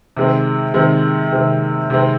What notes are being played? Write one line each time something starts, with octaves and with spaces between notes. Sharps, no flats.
C3 D#3 G#3 C4
C3 D#3 G#3 C4
C3 D#3 G#3 C4
C3 D#3 G#3 C4